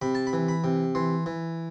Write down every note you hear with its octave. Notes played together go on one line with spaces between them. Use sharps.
C3 B5
A5
B5
E3
B5
C3
E3 C6
E3